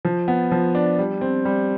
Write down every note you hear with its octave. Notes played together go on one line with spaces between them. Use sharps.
F3
B3
F3
D4
G3
C4
G3